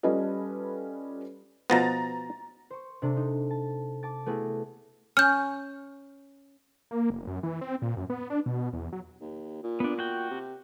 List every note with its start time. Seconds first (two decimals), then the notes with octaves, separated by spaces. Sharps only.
0.03 G3 C#4 F4 A4 B4 D#5
1.70 B2 F3 B3 A#5 A6 A#6
2.70 C5 C#6
3.02 C3 D4 A4
3.17 D#4
3.51 A5
4.03 A5 D6 A6
4.26 A3 B3 E4 F#4 G#4
5.17 C#4 F6 G6
6.91 A#3
7.10 F1
7.27 F#2
7.43 E3
7.61 C4
7.82 A#2
7.97 F#2
8.10 B3
8.30 D4
8.46 B2
8.73 E2
8.92 F#3
9.21 D#2
9.63 A#2
9.80 B3 D4
9.99 F#4 G5
10.31 C3